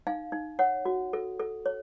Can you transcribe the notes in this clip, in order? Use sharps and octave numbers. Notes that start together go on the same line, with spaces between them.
D#4 F5
D#4
C#5 F#5
F#4
A4
A4
C#5